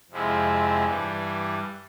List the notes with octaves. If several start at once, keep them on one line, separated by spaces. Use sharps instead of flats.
F2 C3 F3 G#3 E4
G2 E3 G3